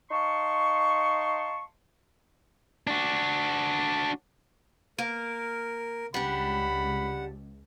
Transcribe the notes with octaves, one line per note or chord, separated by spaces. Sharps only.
D#4 F5 A5 C6 C#6
D4 F#4
A#3 A#4
C#2 G3 D4 F#5 B5